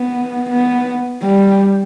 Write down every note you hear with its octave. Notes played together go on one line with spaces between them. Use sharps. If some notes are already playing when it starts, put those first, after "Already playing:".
Already playing: B3
B3
G3